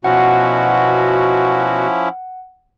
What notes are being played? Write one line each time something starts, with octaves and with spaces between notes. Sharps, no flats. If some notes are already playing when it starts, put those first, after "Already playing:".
B2 F3 C#4 E4 F#4 F#5